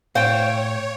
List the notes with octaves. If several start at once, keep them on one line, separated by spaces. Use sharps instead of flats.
A2 C5 C#5 F5 G5